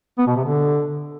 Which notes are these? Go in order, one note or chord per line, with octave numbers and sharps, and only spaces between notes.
B3
B2
C3
D3